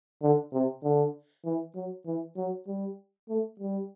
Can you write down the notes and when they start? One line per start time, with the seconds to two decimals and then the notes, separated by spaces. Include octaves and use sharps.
0.22 D3
0.53 C3
0.83 D3
1.45 E3
1.75 F#3
2.06 E3
2.37 F#3
2.67 G3
3.29 A3
3.60 G3